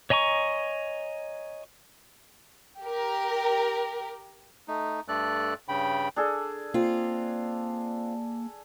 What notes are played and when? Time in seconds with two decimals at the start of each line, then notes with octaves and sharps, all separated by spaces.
0.10 C#5 D#5 G#5 A#5 C#6
2.82 G4 A#4
4.68 A3 D#4
5.08 G2 A3 A4 D5 F#6
5.68 G2 C#3 G5 B5
6.16 D4 G#4 A4
6.74 A#3 C4 F4